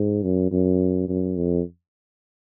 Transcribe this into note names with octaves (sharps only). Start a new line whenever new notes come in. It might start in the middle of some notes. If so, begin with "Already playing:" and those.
Already playing: G#2
F#2
F#2
F#2
F2